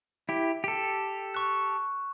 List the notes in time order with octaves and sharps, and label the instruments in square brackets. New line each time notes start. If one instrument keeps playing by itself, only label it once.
[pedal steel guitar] E4 G4
G4 A4
[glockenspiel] C#6 F#6